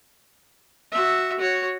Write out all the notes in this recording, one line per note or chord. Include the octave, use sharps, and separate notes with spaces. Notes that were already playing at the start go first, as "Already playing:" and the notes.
F#4 E5
F#4 C#5